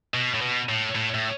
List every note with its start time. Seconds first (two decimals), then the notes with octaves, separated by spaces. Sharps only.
0.14 B2
0.34 A2
0.41 B2
0.69 A2
0.95 A2
1.14 A2